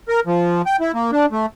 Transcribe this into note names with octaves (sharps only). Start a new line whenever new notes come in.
A#4
F3
G5
E4
A#3
D4
A3